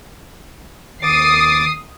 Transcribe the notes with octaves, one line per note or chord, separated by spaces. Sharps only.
D#2 D6 D#6 A6 C7